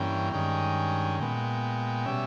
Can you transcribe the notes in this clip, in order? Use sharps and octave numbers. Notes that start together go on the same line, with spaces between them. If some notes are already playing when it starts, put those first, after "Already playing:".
Already playing: G2 E3 A#3 C#4 G5
G2 D#3 G#3 C#4 G5
A#2 G#3 B3 G5
B2 G3 C#4 E5